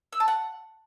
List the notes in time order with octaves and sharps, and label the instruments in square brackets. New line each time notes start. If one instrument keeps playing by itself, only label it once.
[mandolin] E6
A5
F#5